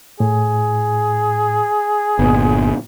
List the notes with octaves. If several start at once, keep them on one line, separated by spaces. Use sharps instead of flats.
A2 G#4
G1 A#2 B3